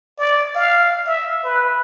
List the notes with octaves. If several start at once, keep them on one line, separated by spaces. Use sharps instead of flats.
D5
F5
E5
B4